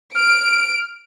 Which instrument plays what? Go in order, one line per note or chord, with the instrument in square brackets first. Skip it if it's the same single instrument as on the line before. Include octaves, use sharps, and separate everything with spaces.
[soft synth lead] F6 [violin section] D7